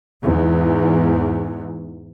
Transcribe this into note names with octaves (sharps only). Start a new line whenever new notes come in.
E2 G#2